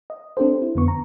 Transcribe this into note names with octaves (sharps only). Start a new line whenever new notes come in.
D#5
C4 D4 G4 A4 C5
E4
F2 D3 B3 C#6
A#5